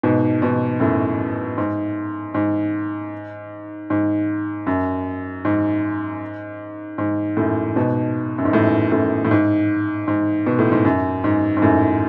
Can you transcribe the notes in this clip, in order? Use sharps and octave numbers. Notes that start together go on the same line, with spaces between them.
G#2 B2
G#2 B2
F#2 A2
G#2
G#2
G#2
F#2
G#2
G#2
F#2 A2
G#2 B2
F#2
G#2
F#2 A2
F#2 A2
A2
G#2
G#2
B2
A2
G#2
F#2
G#2
G#2
F#2 A2